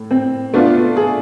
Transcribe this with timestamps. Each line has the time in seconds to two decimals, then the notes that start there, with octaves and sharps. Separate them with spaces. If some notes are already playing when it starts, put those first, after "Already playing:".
Already playing: A2
0.11 C4
0.54 A3 B3 D4 F4
0.97 G#4